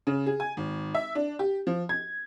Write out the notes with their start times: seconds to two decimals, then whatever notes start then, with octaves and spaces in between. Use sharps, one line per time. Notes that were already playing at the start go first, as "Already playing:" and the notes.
0.07 C#3
0.26 G#4
0.40 G#5
0.57 G#1
0.94 E5
1.15 D4
1.39 G4
1.67 F3
1.89 G#6